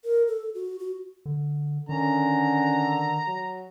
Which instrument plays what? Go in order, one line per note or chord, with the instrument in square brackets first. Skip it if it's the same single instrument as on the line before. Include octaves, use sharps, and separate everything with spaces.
[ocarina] A#4
A4
F#4
F#4
[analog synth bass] D3
[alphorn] D3 [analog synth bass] D#3 [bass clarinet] C#4 [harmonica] A#5
[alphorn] F#3